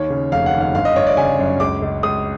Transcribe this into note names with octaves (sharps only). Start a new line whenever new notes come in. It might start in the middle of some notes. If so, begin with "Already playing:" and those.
Already playing: D#2 C#5
C#3
F1 F5
F#5
D#2
F5
G1 F5
D#5
G1 C#5
D5
C#3 G#5
F#2
C#2 D6
C#2
C#2 D#6